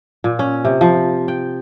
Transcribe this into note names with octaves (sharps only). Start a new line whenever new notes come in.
A#2
C#4
C3
F3
G5